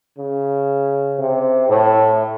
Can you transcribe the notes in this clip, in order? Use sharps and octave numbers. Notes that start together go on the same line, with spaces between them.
C#3
C3
A2